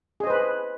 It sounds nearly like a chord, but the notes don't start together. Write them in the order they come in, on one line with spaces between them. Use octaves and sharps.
G#4 D#5 C5 B4